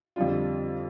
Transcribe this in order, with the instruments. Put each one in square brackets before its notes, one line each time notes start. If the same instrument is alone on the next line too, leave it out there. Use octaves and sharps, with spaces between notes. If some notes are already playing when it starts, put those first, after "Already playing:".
[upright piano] F2 D3 G3 D4 F4